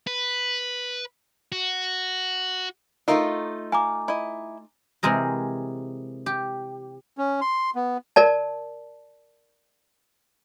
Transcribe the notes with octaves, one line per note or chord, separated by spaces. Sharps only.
B4
F#4
A3 D#4 F4 A#4 D#5 E5
F5 G#5 A#5 D6
E4 D#5
C3 E3 G#3 G#4 A#4
G4
C#4
C6
B3
A#4 D5 A5